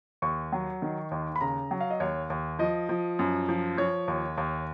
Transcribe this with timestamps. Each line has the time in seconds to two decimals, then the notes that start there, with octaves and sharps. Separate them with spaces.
0.22 D#2 C#6
0.53 F#3
0.82 D#3
1.11 D#2
1.36 B5
1.41 C#3 A#5
1.71 F#3
1.80 F5
1.90 D#5
2.00 D#2 C#5
2.30 D#2
2.59 F3 D#5
2.89 F3
3.19 F#2
3.49 F3
3.77 F3 C#5
4.08 D#2
4.38 D#2